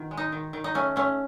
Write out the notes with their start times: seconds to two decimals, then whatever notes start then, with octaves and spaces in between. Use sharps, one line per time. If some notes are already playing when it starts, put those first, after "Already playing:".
Already playing: B2 D#3
0.11 G#3
0.17 D#4
0.32 D#3
0.53 D#3
0.64 D#4
0.75 A3 C#4
0.96 A3 C#4